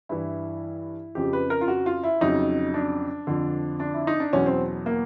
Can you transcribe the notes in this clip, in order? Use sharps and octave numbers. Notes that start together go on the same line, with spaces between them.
G2 E3 E4
F2 C#3 F3 G4
B4
A#4
F4
F#4
F4
E4
F2 C#3 F#3 D#4
D4
F2 D3 F3
D4
E4
D#4
D4
E2 B2 F#3 C#4
C4
A#3